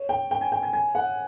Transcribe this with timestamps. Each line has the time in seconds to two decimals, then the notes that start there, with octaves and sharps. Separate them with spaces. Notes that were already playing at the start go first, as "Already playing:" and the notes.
Already playing: C#5
0.09 G5
0.31 G5
0.41 G#5
0.52 G5
0.63 G#5
0.73 G#5
0.95 F#5